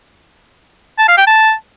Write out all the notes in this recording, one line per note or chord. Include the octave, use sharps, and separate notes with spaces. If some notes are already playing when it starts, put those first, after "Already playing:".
A5
F5
G5
A5